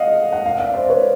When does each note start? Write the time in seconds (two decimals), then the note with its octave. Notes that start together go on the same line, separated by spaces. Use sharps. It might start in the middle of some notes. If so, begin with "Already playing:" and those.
Already playing: D#5 F5 F#5
0.32 F#5
0.46 F5
0.59 D5 E5
0.74 C5 D5
0.89 B4 C#5